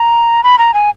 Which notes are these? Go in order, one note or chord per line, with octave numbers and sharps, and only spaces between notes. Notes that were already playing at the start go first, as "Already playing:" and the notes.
Already playing: A#5
B5
A#5
G#5